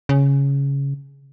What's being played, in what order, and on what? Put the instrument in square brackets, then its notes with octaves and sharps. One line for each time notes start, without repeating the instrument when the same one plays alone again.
[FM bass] C#3